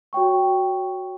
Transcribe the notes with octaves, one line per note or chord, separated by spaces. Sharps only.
F#4 C#5 G5 C#6